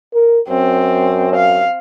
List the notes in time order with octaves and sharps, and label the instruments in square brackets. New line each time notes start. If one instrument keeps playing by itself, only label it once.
[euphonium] A#4
[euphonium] F#2 [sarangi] C4
[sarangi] F5